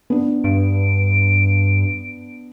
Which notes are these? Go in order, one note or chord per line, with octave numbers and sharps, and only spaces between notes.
B3 D4
G2 D7